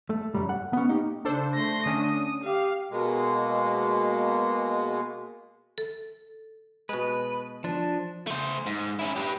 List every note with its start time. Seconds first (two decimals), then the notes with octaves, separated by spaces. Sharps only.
0.10 A3
0.35 F#2 G3
0.49 F#5
0.73 B3 C#4
0.88 A#3 D#4 G4
1.25 C#3 D4 A4 C5
1.55 A3 C6 A#6
1.86 D3 C#4 D4 D#6
2.44 G4 F5
2.91 B2 G#3 A#3
5.78 A4
6.89 B2 G#3 B4
7.64 F3 D4
8.27 A3 C5
8.66 G#2
8.99 C#4 E4
9.16 G4 B4